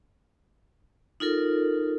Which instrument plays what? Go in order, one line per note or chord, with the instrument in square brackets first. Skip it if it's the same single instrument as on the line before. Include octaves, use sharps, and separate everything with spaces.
[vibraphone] D#4 F4 A4 A#4